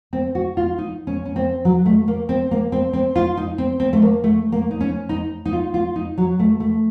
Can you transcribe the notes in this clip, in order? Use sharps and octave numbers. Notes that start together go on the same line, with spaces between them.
C4
F#4
F4
D#4
C#4
C#4
C4
F#3
A3
A#3
C4
A#3
C4
C4
F4
D#4
C4
C4
A3
A#3
A3
A#3
D#4
C#4
D#4
D#4
F4
F4
D#4
F#3
A3
A3